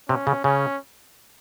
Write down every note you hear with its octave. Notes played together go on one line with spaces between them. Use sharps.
C3 C#4
C#3
C#3 C#4